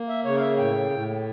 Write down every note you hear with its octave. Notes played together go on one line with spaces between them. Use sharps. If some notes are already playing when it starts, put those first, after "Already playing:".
Already playing: A#3
E5
C#3 C#5
F5
E5
A2 G5
A2